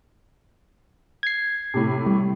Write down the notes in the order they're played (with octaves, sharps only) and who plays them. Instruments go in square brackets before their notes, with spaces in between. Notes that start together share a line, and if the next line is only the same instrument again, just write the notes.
[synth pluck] G#6 C7
[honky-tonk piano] A2 C3
[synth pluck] G3